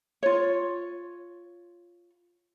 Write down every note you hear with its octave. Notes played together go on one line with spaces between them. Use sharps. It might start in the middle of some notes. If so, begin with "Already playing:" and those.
F4 C#5